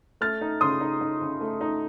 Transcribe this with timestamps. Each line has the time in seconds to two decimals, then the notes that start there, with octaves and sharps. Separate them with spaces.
0.21 A3 F6 A6
0.41 D#4
0.61 C#3 C6 D#6
0.81 D#4
1.01 D#4
1.21 C#3
1.41 A3
1.61 D#4